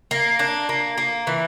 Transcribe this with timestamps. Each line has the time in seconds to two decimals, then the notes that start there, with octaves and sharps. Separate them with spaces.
0.11 A#3
0.39 D4
0.69 A#3
0.98 A#3
1.27 E3